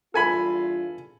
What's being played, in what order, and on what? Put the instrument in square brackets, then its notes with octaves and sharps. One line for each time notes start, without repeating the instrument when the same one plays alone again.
[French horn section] E2 G2 F4 [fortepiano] A4 G#5 B5